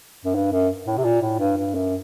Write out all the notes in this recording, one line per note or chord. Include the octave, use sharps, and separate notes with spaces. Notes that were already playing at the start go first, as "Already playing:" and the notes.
F#2
G2
F#2
A2
C3
A#2
A2
G2
G2
F#2